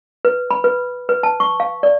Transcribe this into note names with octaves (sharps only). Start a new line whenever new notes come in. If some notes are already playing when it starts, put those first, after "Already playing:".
B4
B5
B4
B4
A5
C#6
F5
D5